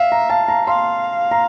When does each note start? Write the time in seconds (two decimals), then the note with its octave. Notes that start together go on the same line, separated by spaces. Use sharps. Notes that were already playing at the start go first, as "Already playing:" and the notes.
Already playing: E5 F5
0.12 A#5
0.30 F5 A5
0.48 A#5
0.66 F5 C6
1.31 A#5